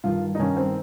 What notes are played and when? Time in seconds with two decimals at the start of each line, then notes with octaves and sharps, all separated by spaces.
0.04 G2 D#3 F4
0.35 D#4
0.39 G2 D#3 C#4
0.57 C4